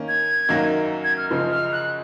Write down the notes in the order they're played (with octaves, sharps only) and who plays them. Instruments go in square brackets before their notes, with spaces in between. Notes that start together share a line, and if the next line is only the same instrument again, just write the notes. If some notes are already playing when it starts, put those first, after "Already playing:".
Already playing: [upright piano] D#3 A#3 C#4
[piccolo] G#6
[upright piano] F#2 D#3 F#3 A#3
[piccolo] G#6
F6
[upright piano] F#2 C#3 F3 G#3 [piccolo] F6
[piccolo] F6
F#6